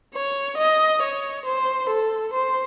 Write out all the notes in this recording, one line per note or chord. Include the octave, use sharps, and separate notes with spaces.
C#5
D#5
C#5
C5
A4
C5